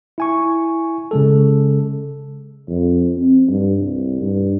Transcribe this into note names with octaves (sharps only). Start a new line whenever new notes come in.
E4 G#5 C#6
C#3 G#3 A4
F2
C4
G2
C2
G2